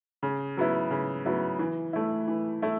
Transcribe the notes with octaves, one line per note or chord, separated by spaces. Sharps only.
C#3
F#3 B3 E4
C#3
F#3 B3 E4
E3
A3 E4
E3
A3 E4